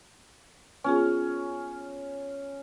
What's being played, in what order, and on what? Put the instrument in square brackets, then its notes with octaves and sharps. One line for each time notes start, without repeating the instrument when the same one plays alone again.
[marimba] B3 F4 G#4 [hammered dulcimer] C#4